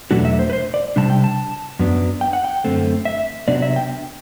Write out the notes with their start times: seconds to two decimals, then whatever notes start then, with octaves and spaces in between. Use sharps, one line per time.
0.11 E2 B2 F#3 A3 D4 F#4
0.25 E5
0.39 C5
0.50 B4
0.53 C5
0.74 D5
0.96 C3 G3 D4 A5
1.10 G5
1.24 A5
1.79 F#2 F#3 B3 D4
2.21 G5
2.33 F#5
2.45 G5
2.64 F#2 D3 A3 C4
3.05 E5
3.48 C3 F#3 B3 D4 D5
3.62 E5
3.76 G5